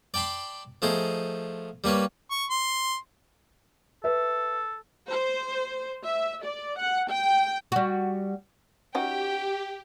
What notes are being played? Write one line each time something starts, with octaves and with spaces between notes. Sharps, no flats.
D5 G5 A5 B5 C6
F3 A3 D#4 G#4 C5
G3 A#3 B4 C#5
C#6
C6
A4 B4 E5
C5
E5
D5
F#5
G5
G3 F#4
C#4 D#4 F#4 G4 G5